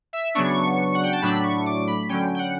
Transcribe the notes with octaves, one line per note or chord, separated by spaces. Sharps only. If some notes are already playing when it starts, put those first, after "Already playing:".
E5
C#3 F#3 B3 D4 C#6
F#5
G5
A5
A2 F#3 A3 D4 B5
C#6
D6
B5
D3 F#3 C#4 G5
G5
F#5